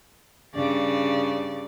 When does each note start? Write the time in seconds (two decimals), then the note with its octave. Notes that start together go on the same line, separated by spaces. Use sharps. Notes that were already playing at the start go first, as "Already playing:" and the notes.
0.55 G2 C#3 D5